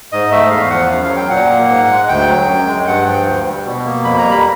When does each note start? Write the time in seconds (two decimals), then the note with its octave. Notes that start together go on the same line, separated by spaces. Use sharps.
0.12 G#2 D#5
0.31 A3 E5
0.51 E2 F5
0.70 F3 F#5
0.90 F#2 F5
1.04 F5
1.10 F#3
1.16 G5
1.29 A#2 F#5
1.49 A#3
1.69 G#2
1.89 G#3
2.09 D2 G5
2.29 F#3
2.47 F#2
2.67 G#3
2.87 G2 F#5
3.06 F3 G5
3.27 D2
3.46 G3
3.65 B2
3.85 A#3
4.04 F2 B5
4.18 A#5
4.24 G3
4.31 B5